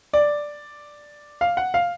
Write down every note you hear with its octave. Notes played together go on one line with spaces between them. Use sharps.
D5
F5
F#5
F5